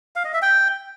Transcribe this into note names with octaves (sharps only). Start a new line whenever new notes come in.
F5
D#5
E5
G5